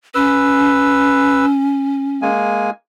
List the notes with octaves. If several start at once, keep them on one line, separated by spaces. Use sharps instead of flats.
C#4 B4 E6
G#3 A#3 G#5